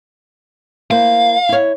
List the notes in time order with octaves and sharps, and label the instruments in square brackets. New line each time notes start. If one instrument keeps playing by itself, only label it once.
[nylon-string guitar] A#3 E4 C5 [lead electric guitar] F5
[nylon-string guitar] E4 C#5